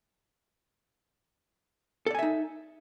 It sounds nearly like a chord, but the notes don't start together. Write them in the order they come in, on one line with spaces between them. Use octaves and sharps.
A4 D5 G#5 E5 D#4